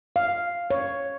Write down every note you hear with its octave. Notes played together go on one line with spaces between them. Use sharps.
F5
C#5